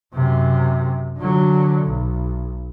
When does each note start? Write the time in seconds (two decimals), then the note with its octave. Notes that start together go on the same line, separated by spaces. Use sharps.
0.14 F#2 C3
1.17 D3 F#3
1.85 B1